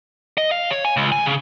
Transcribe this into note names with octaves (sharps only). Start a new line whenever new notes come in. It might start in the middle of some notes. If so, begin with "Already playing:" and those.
D#5
F5
C#5
G#5
C#2
G#5
C#3